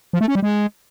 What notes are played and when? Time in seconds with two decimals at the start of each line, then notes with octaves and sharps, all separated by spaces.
0.13 F3
0.21 A3
0.28 C#4
0.35 G3
0.43 G#3